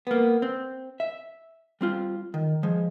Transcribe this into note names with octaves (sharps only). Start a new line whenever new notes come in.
A#3 B3
C4
E5
G3 C4 F4
D#3
F3 G#3